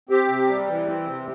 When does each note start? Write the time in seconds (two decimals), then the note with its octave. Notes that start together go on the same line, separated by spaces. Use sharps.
0.09 C4 G4
0.29 C3
0.49 G3
0.68 E3
0.88 C4
1.07 C3